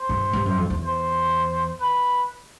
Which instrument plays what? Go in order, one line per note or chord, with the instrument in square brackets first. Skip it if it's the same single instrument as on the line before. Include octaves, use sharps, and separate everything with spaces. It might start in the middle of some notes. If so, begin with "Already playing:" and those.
Already playing: [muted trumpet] C5
[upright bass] G2
G2
F#2
F2
E2
[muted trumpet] C5
B4